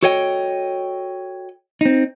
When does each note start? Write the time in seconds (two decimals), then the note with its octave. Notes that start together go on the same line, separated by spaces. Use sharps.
0.03 F#4 A4 C#5 D#5 G5
1.81 C4 D#4